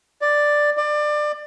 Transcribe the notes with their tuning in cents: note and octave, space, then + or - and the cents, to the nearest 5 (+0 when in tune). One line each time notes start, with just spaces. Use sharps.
D5 +5
D5 +25